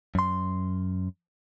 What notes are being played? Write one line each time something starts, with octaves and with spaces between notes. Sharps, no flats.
F#2 C6